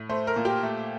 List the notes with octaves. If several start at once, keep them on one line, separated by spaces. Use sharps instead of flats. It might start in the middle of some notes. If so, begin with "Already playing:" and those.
Already playing: A2
A3 C5
A#4
A#2
G4
A3